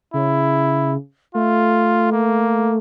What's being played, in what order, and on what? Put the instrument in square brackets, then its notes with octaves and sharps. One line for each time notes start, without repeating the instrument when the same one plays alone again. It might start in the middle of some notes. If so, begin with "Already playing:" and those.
[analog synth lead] C#3 [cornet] E4
[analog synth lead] A3 [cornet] F4
[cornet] A#3